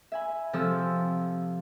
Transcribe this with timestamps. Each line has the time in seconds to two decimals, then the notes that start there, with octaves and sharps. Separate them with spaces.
0.12 E5 G#5 B5
0.53 C3 F3 A4 D#6 E6